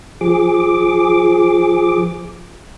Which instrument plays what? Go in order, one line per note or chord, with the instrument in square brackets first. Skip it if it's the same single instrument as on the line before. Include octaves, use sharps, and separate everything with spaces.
[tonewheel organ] F3 G#4 D6